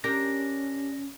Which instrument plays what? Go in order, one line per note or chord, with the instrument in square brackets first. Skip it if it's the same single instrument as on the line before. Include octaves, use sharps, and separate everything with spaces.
[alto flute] C#4 [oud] D4 G4 A#4 [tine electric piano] A#6